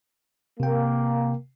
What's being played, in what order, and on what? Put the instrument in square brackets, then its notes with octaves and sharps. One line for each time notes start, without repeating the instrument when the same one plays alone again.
[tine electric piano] C3 G5 [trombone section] A#3